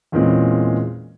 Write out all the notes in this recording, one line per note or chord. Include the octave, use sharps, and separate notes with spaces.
E2 A#2 E3 G#3 C4 C#4